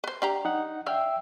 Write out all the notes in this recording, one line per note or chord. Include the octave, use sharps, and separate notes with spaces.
B4 C5
D4 G4 A#5
D#4 F#5
D4 E5 F5 G5 E6